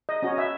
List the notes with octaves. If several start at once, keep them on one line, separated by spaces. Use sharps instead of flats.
D#5
C#4 F#4 C#5 D#5
E5